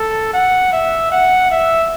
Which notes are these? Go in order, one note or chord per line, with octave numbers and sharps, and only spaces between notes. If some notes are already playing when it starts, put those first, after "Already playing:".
Already playing: A4
F#5
E5
F#5
E5